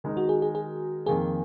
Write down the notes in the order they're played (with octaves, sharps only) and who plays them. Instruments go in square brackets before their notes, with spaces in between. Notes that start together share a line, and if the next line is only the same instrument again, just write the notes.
[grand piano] D#3 G#3 D#4 A#4
[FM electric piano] F#4
G#4
G#4
G#4
[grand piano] F2 D#3 A#3 [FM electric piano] G#4